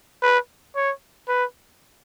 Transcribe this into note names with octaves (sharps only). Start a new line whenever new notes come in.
B4
C#5
B4